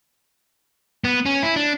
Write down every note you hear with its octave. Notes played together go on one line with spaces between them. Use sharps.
B3
C#4
E4
D4